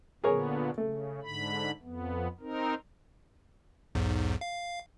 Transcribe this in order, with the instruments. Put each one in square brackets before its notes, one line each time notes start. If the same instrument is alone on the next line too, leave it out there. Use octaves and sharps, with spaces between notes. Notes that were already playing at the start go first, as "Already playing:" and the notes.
[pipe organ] A#2 D3 B3 [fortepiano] G#4 A#4 C#5
[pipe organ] C#3 [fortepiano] A3
[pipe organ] G#2 D3 B5
F2 B3
C4 D#4 A#4
[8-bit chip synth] B1 E2 G#2
F5